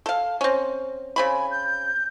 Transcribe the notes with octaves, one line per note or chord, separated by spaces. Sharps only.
A4 F5
C4 C#4
C#3 C4 G#5 B5
G6